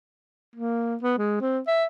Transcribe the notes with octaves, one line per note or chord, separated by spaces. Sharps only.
A#3
B3
G#3
C4
E5